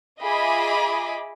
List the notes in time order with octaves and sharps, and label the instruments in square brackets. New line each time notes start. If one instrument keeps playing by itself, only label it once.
[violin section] F4 G#4 D#5 E5 B5 D6